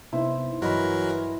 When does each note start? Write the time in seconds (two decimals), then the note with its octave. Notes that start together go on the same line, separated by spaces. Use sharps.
0.13 C3 B3 D#4 E4 C5
0.62 G2 E3 F#3 F#4 A#4 D#5 B5